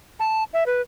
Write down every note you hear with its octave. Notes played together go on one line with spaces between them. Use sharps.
A5
E5
B4